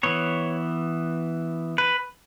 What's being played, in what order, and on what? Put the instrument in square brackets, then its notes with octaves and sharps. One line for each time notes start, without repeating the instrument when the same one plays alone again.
[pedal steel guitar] E3 B3 C#5
B4